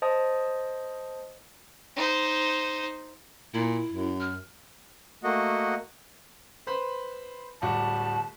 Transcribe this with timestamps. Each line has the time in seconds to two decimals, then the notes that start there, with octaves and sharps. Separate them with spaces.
0.02 C5 D#5 A5 D#6
1.97 D#4 C5
3.54 A#2 E4
3.91 F#2
4.20 F6
5.24 A3 A#3 F#4 D#5 F#5
6.67 B4 C5 B5
7.62 D1 G3 F#4 A5